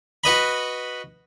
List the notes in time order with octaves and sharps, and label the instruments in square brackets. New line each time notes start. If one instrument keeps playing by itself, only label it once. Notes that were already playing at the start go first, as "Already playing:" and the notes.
[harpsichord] F#4 B4 D#5 B5